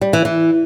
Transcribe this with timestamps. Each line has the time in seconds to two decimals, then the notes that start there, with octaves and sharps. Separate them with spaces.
0.01 G3
0.13 E3
0.25 E3